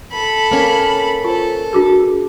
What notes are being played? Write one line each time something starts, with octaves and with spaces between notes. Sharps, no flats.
A4 B5
A#3 C#4
F4 A4 C5
D4 F#4 G#4